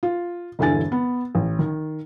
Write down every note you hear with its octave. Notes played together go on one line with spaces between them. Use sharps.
F4
E1 G2 D3 E3 G#5 A6
B3
A1
D#3